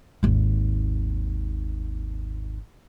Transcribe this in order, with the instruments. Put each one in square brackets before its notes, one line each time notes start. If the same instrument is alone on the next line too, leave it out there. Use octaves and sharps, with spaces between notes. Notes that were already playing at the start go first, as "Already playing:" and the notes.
[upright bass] G#1 D#2